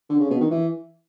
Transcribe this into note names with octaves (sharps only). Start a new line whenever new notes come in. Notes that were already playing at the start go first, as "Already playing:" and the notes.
D3
C#3
B2
D#3
E3